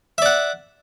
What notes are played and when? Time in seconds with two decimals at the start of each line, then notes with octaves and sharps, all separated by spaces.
0.18 E5
0.22 D5
0.26 F#5